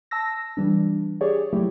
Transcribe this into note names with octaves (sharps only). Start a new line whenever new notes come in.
A5 E6 A#6
E3 G3 D4
G4 G#4 C#5 D5
F#3 A3 E4 G4